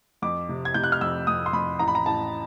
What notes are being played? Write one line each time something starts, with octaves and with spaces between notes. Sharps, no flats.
F2 D6
C3
G#6
C3 G6
F#6
F6
F2 E6
F2 D#6
C6
F2 B5
A1 A#5
B5
A#5
A1 A5